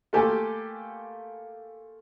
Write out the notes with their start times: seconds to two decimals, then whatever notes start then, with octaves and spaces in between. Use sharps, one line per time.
0.13 A3 A#3 F4 G4 A4 G#5